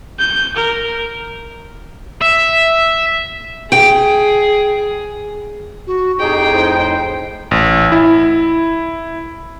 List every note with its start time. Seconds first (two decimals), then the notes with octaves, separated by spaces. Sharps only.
0.19 G6
0.56 A#4
2.22 E5
3.72 G#4 G5
5.87 F#4
6.19 F2 A2 D#4 G4 G#4 G5
6.53 C5
7.51 A1
7.92 E4